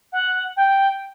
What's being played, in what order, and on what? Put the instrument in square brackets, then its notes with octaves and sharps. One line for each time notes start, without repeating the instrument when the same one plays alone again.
[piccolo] F#5
G5